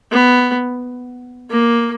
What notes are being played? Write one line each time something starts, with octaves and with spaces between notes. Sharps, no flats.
B3
A#3